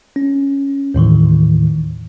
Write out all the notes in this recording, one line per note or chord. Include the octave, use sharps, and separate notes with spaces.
C#4
D#2 A2 D#3 E3